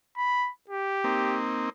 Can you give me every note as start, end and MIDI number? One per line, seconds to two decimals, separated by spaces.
0.17 0.50 83
0.70 1.38 67
1.04 1.70 58
1.04 1.70 60
1.04 1.70 63